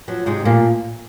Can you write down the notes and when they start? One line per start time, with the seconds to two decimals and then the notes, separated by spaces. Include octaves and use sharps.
0.08 F3 F#3
0.26 G#2 C3 G#3
0.45 A#2 F3 A#3